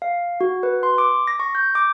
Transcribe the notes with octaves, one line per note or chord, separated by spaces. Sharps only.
F5
F#4
B4
C6
D6
A#6
C#6
G6
D6